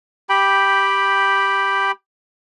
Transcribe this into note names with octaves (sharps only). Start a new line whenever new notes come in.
G4 G5 B5